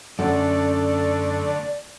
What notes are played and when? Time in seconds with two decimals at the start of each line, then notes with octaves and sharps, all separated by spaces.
0.19 F#2 D3 A3 A4 D5